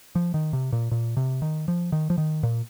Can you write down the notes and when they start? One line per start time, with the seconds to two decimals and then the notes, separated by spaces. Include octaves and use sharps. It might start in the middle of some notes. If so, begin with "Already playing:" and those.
0.15 F3
0.34 D#3
0.53 C3
0.73 A#2
0.92 A#2
1.17 C3
1.42 D#3
1.68 F3
1.92 D#3
2.10 F3
2.18 D#3
2.43 A#2